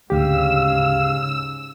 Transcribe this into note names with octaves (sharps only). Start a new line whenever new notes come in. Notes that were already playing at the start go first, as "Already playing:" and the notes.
D2 G#2 C#3 G4 F5 E6